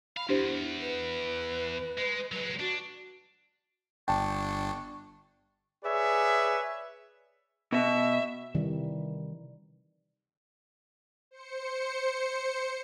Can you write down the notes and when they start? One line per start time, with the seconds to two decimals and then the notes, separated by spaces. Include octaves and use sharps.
0.17 F5 B5
0.29 E2 D4 E4 G4 C5
0.81 B4
1.98 G#3
2.32 F#3 G#3 B4
2.60 D4 F#4
4.08 G1 D4 G5 A5 C#6
5.84 G#4 B4 C#5 D5 E5
7.72 B2 E5
8.55 C3 D#3 E3 G3
11.31 C5 C#7